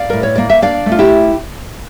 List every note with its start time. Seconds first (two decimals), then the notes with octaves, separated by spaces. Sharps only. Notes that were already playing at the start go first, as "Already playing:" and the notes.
Already playing: D5 F5
0.10 A2 A#4
0.23 C#5
0.36 A#3 D5
0.50 E5
0.62 D4 D5 F5
0.86 A3
0.92 F4
0.99 E4 G4